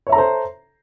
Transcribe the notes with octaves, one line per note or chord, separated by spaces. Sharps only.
A4 C5 C#5 E5 A#5